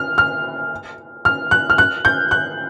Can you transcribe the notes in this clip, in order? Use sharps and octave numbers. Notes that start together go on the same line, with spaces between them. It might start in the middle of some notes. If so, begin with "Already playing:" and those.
Already playing: F6
F6
F6
F#6
F6
F#6
G6
F#6